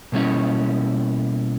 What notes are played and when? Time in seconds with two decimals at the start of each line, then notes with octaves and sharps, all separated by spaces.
0.12 B2 G3 A#3 C#4 E4